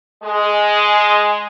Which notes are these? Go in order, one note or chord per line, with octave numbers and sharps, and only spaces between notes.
G#3